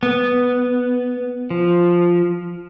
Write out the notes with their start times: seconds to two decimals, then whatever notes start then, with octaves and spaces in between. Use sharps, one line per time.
0.03 B3
1.50 F3